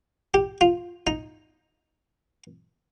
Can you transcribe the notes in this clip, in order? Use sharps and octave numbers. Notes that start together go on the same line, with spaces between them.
G4
F4
D#4